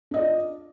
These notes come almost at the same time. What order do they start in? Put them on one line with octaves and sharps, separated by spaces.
D4 D#5 D5 F4